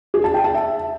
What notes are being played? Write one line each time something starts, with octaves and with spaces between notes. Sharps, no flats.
G#4
A5
G5
A5
E5